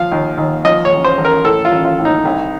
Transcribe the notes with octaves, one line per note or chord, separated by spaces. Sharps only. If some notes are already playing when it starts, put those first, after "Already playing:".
Already playing: F3 F5
D#2
D#2
F3 D#5
C#5
A1
C5
A1
A#4
A2 A4
F4
A1
F4
A2
D#4
C2